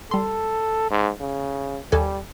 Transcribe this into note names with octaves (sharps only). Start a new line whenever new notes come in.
G3 A4 C6
G#2
C#3
D#2 G3 A4 G#5